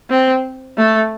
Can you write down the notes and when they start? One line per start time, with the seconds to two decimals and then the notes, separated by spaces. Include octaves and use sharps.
0.10 C4
0.77 A3